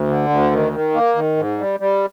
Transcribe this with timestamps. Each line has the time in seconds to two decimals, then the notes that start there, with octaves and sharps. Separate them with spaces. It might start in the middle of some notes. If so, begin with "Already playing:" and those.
Already playing: D2
0.08 D3
0.30 D2
0.51 D#3
0.73 D#3
0.94 A#3
1.15 D#3
1.37 G#2
1.59 G3
1.80 G3